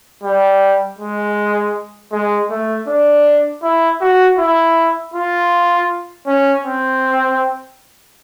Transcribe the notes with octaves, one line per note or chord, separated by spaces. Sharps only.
G3
G#3
G#3
A3
D4
E4
F#4
E4
F4
C#4
C4